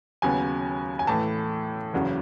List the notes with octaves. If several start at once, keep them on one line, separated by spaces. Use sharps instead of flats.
D#2 C#3 F#3 B3 G#5
G#5
A2 E3 A3 A5
F#1 E2 C#3 F#3